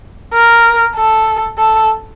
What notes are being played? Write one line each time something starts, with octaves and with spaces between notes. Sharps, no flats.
A#4
A4
A4